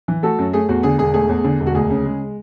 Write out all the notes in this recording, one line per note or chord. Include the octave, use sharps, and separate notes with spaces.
E3
A3 F#4 A4
F#2
A3 G#4
E2 F#4
D3 G#4
E1 G#4
A3 G#4
E2
D3
E1
F#4
D2 G#4
C#3
G#3